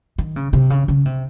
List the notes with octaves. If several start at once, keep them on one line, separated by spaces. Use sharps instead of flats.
D#3
C#3
C3
C#3
C#3
C3